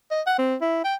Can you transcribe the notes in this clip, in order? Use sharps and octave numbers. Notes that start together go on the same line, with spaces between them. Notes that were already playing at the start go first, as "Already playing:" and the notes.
D#5
F#5
C4
E4
G5